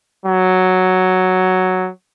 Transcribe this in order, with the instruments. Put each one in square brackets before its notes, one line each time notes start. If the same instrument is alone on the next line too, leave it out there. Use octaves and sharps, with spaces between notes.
[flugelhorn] F#3